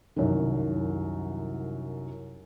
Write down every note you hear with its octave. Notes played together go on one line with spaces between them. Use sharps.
C2 F#2 D#3